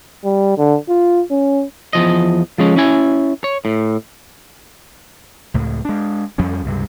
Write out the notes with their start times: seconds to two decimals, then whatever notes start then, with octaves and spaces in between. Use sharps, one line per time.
0.24 G3
0.58 D3
0.89 F4
1.31 C#4
1.93 E2 F3 D#5
2.58 F3 G#3 C#4
2.76 C#4 E4 G#5
3.44 C#5
3.65 A2
5.54 C#2 A2
5.85 G#3 D4
6.38 F2 F3 G3 C#4
6.65 C#2 G2 C3